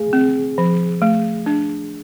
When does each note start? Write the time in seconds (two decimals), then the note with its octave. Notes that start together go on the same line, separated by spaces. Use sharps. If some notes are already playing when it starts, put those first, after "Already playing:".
Already playing: A3 G#4
0.13 C4
0.58 F3
1.02 A3
1.46 D4